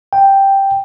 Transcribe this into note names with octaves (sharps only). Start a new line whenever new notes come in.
G5